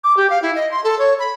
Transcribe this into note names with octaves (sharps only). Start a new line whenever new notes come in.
D6
G4
F5
E4
D#5
C6
A4
C#5
B5